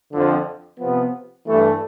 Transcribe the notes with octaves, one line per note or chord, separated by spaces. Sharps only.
F2 D3 F3 C4
C3 F3 B3
G2 E3 A3